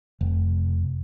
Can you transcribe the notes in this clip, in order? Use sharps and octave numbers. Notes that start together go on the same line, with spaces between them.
F1